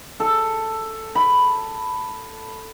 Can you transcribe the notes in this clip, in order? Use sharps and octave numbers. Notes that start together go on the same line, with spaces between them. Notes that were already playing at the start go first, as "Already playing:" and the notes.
A4
B5